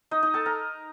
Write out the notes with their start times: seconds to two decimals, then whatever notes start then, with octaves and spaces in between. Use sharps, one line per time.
0.11 D#4 D#5
0.23 D#4 D#5
0.34 A4 A5
0.46 A#4 A#5